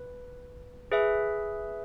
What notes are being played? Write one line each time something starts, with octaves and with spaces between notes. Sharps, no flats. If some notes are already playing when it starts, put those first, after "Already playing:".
Already playing: B4
G#4 B4 E5